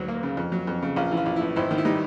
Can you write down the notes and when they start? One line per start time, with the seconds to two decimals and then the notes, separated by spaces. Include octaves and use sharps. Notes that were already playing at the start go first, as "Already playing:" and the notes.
Already playing: D2 G#2 F#3
0.08 A#3
0.23 C#3
0.37 F2
0.52 F#3
0.67 F2
0.83 C#3
0.96 A#1 F4
1.12 E3
1.17 F4
1.26 A#1
1.36 A2 E4
1.56 G#1 E4
1.71 D#3
1.78 E4
1.85 G3 D#4